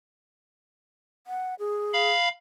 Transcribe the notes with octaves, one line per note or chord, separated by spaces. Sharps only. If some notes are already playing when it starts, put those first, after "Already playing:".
F#5
G#4
F5 B5